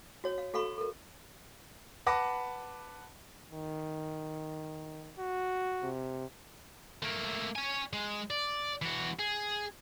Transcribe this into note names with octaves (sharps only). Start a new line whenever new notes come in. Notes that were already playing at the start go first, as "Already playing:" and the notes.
F#4 C#5
F5
F#4 A4 F5 B5 C#6
A4 A#4
B4 F#5 A5 B5 D6 A#6
D#3
F#4
C3
A3 A#3
C#5 G#5
G#3
D5
E3 F#4
G#4